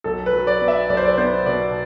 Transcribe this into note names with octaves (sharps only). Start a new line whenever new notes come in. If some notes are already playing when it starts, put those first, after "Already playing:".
B1 A4
B4
F#3
D5
B3
E5
B1 D5
C5
D5
B3 C5
B2 D5